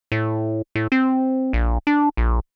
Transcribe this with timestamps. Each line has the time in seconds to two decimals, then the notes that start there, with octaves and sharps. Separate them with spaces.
0.12 A2
0.75 A2
0.92 C4
1.53 A#1
1.87 D4
2.17 A#1